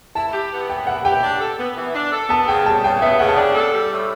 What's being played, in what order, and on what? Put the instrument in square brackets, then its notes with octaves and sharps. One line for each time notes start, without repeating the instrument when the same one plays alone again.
[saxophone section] E4 [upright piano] A5
[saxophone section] G4
B3
[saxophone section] E3 [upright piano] G5
[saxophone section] E4 [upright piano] F#5
[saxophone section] G4 [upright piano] G5
[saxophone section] D4
A4
B3
E3
D4
A4
[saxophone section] B3 [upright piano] A5
[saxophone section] C#3 [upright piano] G5
[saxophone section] G3 [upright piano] A5
[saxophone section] C#3 [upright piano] G5
[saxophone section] B3 [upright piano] E5
[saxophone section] C#3 [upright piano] F#5
[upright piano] A5
[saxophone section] D4 [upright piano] G5
[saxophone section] A4
G3
A2